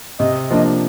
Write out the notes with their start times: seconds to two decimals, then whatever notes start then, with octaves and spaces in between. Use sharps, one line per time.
0.19 C3 D#5
0.50 F3 A#3 D4